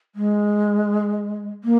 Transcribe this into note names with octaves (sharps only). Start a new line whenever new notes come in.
G#3
A#3